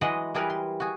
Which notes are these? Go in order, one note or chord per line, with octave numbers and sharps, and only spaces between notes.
E3 F#3 G#3 D#5 F#5 C6
E3 G3 G#4 A#4 B4
C6
F#4 G#4